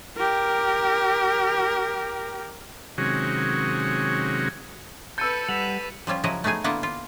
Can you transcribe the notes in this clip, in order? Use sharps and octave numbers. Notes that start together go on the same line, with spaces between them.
G4 A#4
C3 D#3 F#3 G#3 C#4 F#4
A4 B4 E6 G6 A6 C#7 D#7
G3 B4 F#5 B6 E7 F7
F3 G3 C#4 F4
C#3 F3 F#3 E4 D#5 A#5
A3 B3 D#4 G#4 G#5
D3 A#3 B3 E4 F4 F#5
F4